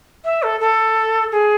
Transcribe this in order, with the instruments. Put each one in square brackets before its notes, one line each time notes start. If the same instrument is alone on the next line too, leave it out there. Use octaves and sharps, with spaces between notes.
[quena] E5
A4
A4
G#4